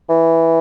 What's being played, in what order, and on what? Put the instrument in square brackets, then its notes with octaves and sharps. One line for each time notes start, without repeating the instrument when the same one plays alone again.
[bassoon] E3